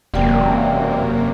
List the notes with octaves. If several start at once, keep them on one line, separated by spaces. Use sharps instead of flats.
E1 F#2 C3 A#3 D5 G5